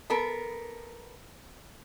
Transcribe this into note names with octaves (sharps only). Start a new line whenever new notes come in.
B3 A4 A#4